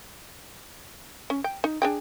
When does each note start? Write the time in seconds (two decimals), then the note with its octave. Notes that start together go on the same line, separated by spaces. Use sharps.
1.30 C#4
1.44 G5
1.64 D#4
1.82 D4 G#4 G5